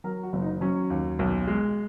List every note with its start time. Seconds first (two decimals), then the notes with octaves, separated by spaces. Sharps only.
0.04 F#3 A#4
0.23 F#4
0.33 F#1
0.42 D#4
0.61 F#3 C#4
0.90 D#2
1.19 B1
1.47 G#3